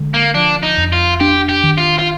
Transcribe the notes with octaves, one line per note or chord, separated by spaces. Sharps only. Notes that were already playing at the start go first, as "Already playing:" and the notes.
Already playing: D3 G#3
A#3
F3 D4
D#4
F2
F4
D4 G4
G4
D#3
F4
F4